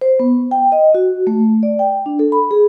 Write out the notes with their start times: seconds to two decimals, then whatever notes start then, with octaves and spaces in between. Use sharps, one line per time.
0.01 C5
0.20 B3
0.51 G5
0.72 D#5
0.94 F#4
1.27 A3
1.63 D5
1.79 G5
2.06 D4
2.19 A4
2.32 B5
2.51 G#4